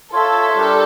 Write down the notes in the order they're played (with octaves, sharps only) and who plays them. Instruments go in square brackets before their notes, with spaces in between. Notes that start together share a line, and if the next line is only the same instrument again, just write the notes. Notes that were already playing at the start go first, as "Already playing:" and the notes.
[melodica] F4 C#5 E5 [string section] A4
[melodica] G3 D4 G4 A#4 [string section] A4